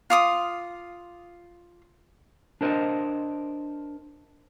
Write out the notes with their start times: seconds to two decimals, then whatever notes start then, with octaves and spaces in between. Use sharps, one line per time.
0.10 F4 D6 D#6
2.61 D4 A#4 C5 D#5